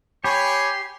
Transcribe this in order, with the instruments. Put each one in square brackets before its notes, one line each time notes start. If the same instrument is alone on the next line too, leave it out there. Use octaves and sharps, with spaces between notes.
[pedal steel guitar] G4 [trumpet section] C#5 G#5 [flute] B5 [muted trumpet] C6